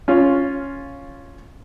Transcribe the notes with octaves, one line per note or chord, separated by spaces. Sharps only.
C#4 F4